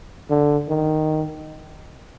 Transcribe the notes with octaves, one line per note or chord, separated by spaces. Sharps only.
D3
D#3